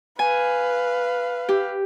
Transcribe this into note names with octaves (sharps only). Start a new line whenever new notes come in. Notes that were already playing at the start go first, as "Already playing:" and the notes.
B4 F5 G#5
G4